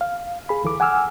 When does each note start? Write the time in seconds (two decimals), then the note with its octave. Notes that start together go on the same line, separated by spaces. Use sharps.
0.01 F5
0.49 G#4 B5
0.63 D2 E3 A4 D6
0.80 F#5 G#5 D6 E6 F6